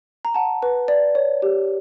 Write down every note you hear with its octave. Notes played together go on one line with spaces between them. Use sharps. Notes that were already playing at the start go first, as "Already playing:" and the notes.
A#5
F#5 A5
B4
D5
C#5
G4